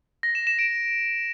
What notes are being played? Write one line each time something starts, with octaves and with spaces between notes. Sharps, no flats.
A#6
E7
E7
D7